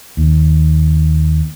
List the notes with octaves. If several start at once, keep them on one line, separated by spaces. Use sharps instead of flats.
D#2